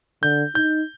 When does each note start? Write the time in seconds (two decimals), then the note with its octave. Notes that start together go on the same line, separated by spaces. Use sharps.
0.23 D3 G6
0.55 D#4 G6